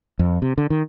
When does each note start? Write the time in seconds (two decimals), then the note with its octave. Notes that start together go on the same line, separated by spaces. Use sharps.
0.19 F2
0.42 C3
0.58 D3
0.70 D#3